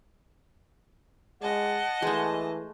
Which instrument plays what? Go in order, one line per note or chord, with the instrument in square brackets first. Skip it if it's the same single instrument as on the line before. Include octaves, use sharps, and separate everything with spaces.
[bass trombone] G#3 [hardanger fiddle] D#5 A5 [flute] F#5
[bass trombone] E3 [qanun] G#3 A3